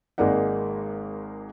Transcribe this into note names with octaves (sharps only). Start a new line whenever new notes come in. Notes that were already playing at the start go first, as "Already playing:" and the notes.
G#1 G#3 A#3 D#4 D5 F#5